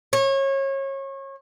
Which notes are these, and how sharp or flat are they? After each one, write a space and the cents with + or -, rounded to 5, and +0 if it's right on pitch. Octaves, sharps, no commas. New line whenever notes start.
C#5 -30